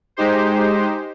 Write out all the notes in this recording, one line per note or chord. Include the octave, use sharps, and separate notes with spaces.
G#3 D#4 G4 C5